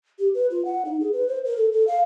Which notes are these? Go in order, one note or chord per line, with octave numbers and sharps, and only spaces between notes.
G4
B4
F4
F#5
D#4
G#4
B4
C5
A#4
A4
A4
F5